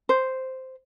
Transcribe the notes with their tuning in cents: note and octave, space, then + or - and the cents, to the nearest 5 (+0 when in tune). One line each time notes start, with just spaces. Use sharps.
C5 -5